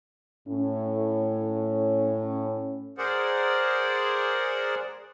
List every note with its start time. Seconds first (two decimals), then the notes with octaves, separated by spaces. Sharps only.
0.47 A2 C#4
2.98 G#4 A#4 C5 D5 F#5